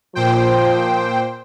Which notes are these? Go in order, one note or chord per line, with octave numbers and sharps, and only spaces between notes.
A#2 F3 C5 G5